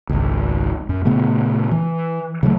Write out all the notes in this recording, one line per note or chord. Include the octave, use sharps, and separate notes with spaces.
G#1 C#2
F#2
A#2 C#3 A3 B3
E3
C#3 F#3 A3